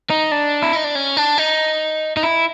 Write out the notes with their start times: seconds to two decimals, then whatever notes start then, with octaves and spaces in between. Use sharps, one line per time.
0.10 D#4
0.32 D4
0.63 E4
0.73 D#4
0.84 D4
0.95 C#4
1.17 D4
1.38 D#4
2.17 D#4
2.23 E4